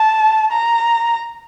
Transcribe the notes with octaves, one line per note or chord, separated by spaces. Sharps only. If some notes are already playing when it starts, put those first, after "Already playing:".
Already playing: A5
A#5